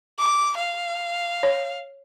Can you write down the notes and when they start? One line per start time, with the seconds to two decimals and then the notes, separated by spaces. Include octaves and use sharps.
0.19 D6
0.57 F5
1.43 C#5